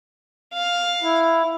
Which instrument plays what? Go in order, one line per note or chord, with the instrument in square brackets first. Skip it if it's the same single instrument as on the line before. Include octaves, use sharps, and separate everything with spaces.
[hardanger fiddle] F5
[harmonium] E4